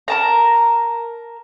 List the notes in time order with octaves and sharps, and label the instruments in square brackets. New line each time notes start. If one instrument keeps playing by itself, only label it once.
[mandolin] A#4 A5 A#5